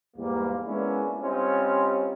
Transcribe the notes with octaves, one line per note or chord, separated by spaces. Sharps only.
E2 G#2 G3 A#3
G#3 A#3 B3 C#4 D4 E4
G3 C4 C#4 D#4 F4